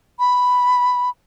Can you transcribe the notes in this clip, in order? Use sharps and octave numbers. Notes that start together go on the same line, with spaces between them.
B5